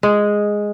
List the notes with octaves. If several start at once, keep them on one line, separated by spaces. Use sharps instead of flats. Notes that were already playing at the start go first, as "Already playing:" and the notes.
G#3